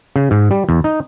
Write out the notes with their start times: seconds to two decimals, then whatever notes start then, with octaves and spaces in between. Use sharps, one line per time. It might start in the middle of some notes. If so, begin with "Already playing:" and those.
0.16 C#3
0.31 G#2
0.51 G3
0.69 E2
0.84 D#4